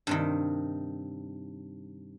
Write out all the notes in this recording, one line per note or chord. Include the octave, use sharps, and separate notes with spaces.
G2 C3 D#3